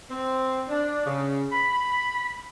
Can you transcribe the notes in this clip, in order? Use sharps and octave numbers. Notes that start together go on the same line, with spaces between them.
C4
D4
C#3
B5